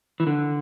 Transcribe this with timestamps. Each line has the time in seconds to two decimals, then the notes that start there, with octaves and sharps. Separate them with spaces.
0.20 E3
0.27 D3